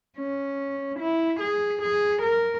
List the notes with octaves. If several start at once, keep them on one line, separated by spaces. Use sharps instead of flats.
C#4
E4
G#4
G#4
A#4